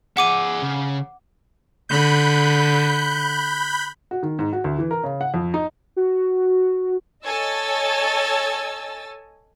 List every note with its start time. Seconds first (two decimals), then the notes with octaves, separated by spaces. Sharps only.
0.17 G#4 E5 F#5 D6 D#7
0.62 C#3
1.89 D3 B5 F#6 G6
4.11 F#4
4.23 D#3
4.39 G#2
4.53 F#4
4.64 D2
4.79 E3
4.91 A#4
5.04 C#3
5.21 F#5
5.34 F2
5.54 D#4
5.96 F#4
7.23 A4 C#5 D#5 G#5 E6 A6